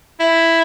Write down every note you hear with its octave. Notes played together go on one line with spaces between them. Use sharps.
E4